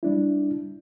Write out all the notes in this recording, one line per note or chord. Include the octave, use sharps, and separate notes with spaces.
G3 D4 E4